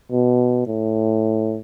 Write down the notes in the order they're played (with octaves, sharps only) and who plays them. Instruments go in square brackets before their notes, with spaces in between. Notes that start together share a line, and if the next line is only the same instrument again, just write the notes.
[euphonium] B2
A2